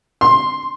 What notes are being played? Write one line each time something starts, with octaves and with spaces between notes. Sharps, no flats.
C6